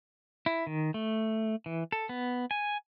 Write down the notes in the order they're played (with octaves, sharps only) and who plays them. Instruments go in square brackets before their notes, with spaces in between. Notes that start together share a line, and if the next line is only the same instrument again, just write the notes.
[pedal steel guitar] E4
D#3
A3
E3
A4
B3
G#5